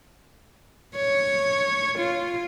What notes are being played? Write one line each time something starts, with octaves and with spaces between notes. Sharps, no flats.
C#5
F4